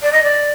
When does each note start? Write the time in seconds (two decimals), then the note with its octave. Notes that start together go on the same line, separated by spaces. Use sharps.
0.02 D5
0.12 D#5
0.23 D5